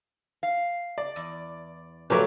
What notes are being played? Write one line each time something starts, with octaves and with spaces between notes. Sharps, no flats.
F5
D5
E2
A#2 F#3 A3 G4 B4 D5